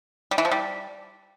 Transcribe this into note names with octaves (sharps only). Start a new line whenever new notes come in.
G3
E3
F3
G3